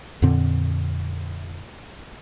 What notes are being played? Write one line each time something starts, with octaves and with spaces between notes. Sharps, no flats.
F2 A#2 D3 C4